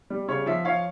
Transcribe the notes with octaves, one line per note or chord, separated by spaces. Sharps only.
G3
C#3 C#5
F3 E5
F3 C#5 F5